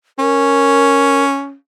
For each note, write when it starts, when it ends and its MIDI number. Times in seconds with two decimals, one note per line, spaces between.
0.19 1.54 61
0.19 1.23 70